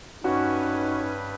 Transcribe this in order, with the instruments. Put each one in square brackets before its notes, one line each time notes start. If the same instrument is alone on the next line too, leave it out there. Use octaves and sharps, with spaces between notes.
[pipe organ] G2 B4 [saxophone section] C#4 [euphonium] D#4 [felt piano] F#4